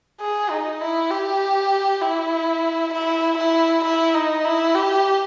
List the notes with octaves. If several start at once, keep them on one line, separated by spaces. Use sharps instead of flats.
G#4
D#4
E4
G4
E4
E4
E4
E4
D#4
E4
G4